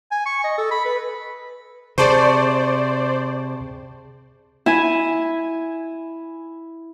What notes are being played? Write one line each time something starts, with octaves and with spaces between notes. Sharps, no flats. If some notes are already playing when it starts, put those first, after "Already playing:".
G#5
C#6
D#5
A4
B5
B4
C3 G#4 C5 D5 A5 C#6
E4 G#5